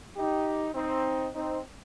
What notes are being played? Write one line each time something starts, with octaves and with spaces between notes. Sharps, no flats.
D#4 G4
C4 D#4
C4 D#4